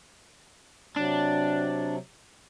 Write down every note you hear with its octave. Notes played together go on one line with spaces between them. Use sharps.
C3 F#3 D4